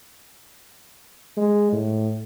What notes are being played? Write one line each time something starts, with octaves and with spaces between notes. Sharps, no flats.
G#3
A2